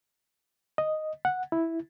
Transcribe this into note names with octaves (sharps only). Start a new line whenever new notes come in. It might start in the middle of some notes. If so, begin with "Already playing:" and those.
D#5
F#5
E4